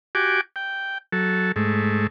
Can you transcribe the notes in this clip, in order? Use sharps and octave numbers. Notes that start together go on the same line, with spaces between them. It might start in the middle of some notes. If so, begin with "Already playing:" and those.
F#4 G4 G#5 D6
G5
F#3 A4
G#2 A3